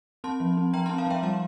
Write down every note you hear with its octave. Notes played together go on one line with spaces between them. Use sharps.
C4 A5 C6
F3
C4
F3 G5 A#5
C4 A5 C6
F5 A5
F3 E5 G5
G3 F5 A5